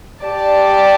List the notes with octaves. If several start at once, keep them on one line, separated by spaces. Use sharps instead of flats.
G4 D5 A5